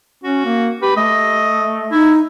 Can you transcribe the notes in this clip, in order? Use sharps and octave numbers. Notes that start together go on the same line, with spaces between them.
C#4 F#4
A#3
G4 B4
A3 D#5
D#4 E4